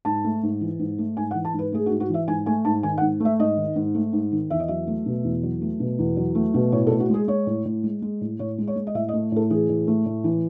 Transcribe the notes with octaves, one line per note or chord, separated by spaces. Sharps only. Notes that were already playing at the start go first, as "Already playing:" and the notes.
G#2 A5
A3
G#2
E3
G#2
A3
G#2 G#5
F#5
E3
A5
G#2 B4
A3 G#4
F#4
G#2
F#4
E3 E5
G#2 G#5
A3 G#5
G#2 A5
D#3 G#5
F#5
G#2
A3 E5
G#2 D#5
D#3
G#2
A3
G#2
D#3
E2 E5
D#5
F#3 E5
A3
B2
E2
F#3
A3
B2
E2
F#3
A3
B2
A2 C#5
A4
A2
F#4
G#3 G#4
G#3 C#5
A2
A2
G#3
G#3
A2
A2 C#5
G#3
C#5
G#3
D#5
A2 E5
D#5
A3
A2 A4
E3 G#4
A2
A3
A2
E3